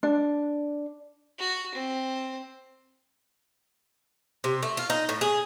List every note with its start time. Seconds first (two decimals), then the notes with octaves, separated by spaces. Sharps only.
0.03 D4
1.39 F#4
1.75 C4
4.44 C3
4.63 A3
4.77 F4
4.90 D#4
5.09 A2
5.21 G#4